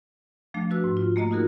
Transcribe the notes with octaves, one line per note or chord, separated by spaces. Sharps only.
F3 A3 D4
D4 F#4 B4 E6
G#2
F4
A3 A#3 D#5 A#5
D#4 F4 F#4 G#4 A#4